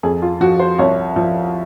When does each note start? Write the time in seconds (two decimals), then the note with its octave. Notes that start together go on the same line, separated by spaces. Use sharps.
0.03 F2 G#4
0.22 F4
0.41 F3 F#4
0.59 C5
0.78 C2 C#5
1.16 F3